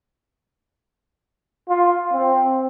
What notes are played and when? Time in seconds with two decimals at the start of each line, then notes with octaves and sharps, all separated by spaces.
1.69 F4
2.13 C4